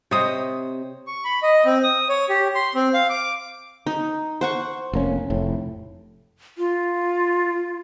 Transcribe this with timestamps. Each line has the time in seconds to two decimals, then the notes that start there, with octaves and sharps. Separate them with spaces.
0.11 C3 C5 C#5 D#5 D#6
1.07 C#6
1.24 B5
1.43 D#5
1.65 C4
1.84 D#6
2.09 C#5
2.29 G4
2.55 C6
2.75 C4
2.94 F5
3.09 D6
3.87 D#4
4.41 C5 F#5 C#6
4.93 F1 A#3 C#4
5.30 F1 A2
6.58 F4